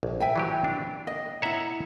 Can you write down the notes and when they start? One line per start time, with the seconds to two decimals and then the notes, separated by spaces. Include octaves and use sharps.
0.03 A#1
0.20 E5 G5 G#5
0.36 E3 F#3 G4
0.64 D4
1.07 D#5
1.42 E4 C#5 E5 F#5 A#5